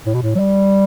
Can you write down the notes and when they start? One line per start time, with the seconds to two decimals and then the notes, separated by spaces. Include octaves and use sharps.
0.06 A2
0.14 B2
0.23 A2
0.35 F#3
0.39 G3